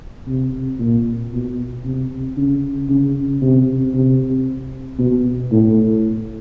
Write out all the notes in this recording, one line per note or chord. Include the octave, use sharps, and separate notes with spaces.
C3
A#2
B2
C3
C#3
C#3
C3
C3
B2
A2